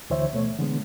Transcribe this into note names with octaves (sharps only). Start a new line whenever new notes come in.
D2 D3 E3 C5 C#5 E5
B2 A3 C#5
D3 E3 G#3 B3